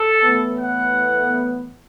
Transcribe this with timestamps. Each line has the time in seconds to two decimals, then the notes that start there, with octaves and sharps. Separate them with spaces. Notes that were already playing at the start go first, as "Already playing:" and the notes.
Already playing: A4
0.23 A2 E3 B3
0.59 F#5